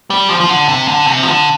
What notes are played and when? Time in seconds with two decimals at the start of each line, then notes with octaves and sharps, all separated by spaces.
0.10 G3
0.30 F3
0.40 F3
0.49 D3
0.68 C3
0.88 D3
1.07 C3
1.23 F3
1.27 D3